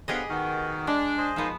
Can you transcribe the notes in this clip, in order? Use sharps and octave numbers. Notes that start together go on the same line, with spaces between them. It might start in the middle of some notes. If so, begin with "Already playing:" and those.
D3 F3 B3 G4 G#4 D#5 F5
D#3 B3 F#4 A#4
G#3 D4
G#4 C5 D#5
F3 G#3 A#3 B3 D#4